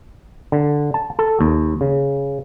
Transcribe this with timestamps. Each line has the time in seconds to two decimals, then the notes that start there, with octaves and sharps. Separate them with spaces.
0.52 D3
0.94 A5
1.19 A4
1.40 D#2
1.81 C#3